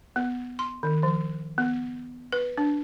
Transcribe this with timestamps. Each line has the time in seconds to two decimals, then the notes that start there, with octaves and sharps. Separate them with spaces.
0.16 B3
0.59 C6
0.83 D#3
1.03 F3
1.58 B3
2.32 B4
2.57 D4